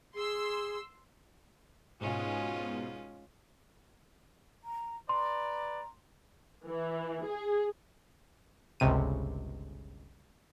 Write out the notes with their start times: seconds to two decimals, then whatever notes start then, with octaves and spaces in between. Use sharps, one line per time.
0.15 G#4 C6 E6
2.01 G#2 B2 G#3 C#4 F4
4.64 A#5
5.09 B4 D5 A#5 C6
6.67 E3
7.25 G#4
8.80 G1 C#2 C3 D#7